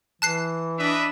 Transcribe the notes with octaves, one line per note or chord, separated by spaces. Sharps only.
E3 A5 F#6 C7
D4 B4 D#5 E5